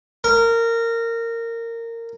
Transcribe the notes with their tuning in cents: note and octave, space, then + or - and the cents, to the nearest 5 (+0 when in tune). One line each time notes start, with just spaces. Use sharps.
A#4 -20